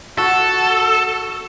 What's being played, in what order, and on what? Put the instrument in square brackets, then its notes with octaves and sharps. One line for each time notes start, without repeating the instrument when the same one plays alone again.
[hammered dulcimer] F#4 [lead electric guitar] A4